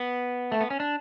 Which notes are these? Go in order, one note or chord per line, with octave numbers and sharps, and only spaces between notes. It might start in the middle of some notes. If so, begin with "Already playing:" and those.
Already playing: B3
A3
B3
C#4
D4